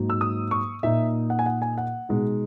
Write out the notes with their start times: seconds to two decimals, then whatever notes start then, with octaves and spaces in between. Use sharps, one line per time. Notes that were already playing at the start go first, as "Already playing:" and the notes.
Already playing: G#2 F#3 A#3 D#4
0.10 E6
0.21 D#6
0.51 C#6
0.83 A#2 A#3 D#4 E5
1.30 F#5
1.39 G#5
1.46 F#5
1.62 G#5
1.78 F#5
2.09 B2 G#3 D#4